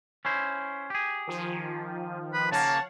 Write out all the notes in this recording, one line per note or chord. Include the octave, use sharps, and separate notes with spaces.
C#4 E4 C5
G4 G#4
D#3 F3
B4
C#3 A#3 C#5 F5 F#5 A5